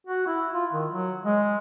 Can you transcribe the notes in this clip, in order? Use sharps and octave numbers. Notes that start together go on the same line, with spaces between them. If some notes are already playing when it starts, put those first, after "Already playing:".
F#4
E4
F4
D#3
F#3
G#3